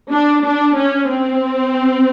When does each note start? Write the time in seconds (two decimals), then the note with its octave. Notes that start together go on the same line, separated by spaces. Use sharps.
0.12 D4
0.45 D4
0.77 C#4
1.10 C4